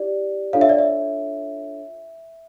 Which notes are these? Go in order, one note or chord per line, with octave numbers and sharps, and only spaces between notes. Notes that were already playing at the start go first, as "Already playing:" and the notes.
Already playing: E4 G4 D5
D4 F4 A4 C#5 F5
E5
D5
E5